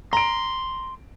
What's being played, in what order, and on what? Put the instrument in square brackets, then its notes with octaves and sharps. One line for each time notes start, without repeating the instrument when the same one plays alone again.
[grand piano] A#5 D7 [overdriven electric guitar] C6